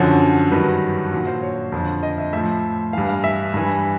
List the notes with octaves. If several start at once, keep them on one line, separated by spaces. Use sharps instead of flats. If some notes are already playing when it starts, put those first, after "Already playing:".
Already playing: F#2 D3 F3 C#5
G2 D#3 F#3 B4
A#2 F#3
C5
C#5
F2 D3 F3
D#5
E5
A2 F3 E5
G2 E3 F5
F5
E5
G2 E3